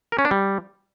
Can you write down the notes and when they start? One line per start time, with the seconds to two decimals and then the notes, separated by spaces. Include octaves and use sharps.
0.12 A#4
0.19 C#4
0.25 D4
0.31 G3